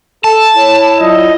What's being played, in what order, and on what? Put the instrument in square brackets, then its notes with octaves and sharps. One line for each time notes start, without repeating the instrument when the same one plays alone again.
[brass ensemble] A4 [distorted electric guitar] A5
[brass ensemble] E4 [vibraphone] C#5
[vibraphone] F#3 F4 D5 [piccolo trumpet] D#5